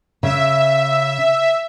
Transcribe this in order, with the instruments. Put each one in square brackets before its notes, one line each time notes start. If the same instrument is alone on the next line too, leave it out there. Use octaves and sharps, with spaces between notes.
[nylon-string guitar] C#3 [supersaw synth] E5